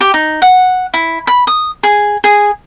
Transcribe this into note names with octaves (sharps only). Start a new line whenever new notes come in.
G4
D#4
F#5
E4
B5
D#6
G#4
G#4